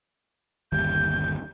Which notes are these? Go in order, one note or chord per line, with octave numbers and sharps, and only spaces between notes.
G1 D#2 G3 G6